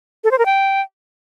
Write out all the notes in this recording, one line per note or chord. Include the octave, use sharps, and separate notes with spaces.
A4
C5
A#4
G5